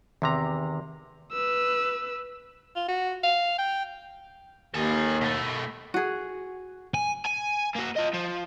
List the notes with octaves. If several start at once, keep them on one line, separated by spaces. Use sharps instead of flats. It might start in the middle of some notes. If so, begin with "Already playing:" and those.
E2 C3 D#3 A#5
B4 E6
F4
F#4
F5
G5
D#2 A4 G#5
B2 A3
F#4 G#4
G#5
G#5
A#3 F#4
F4 D#5
F3